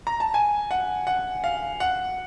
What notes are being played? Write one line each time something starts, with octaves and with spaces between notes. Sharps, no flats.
A#5
A5
G#5
F#5
F#5
F5
F#5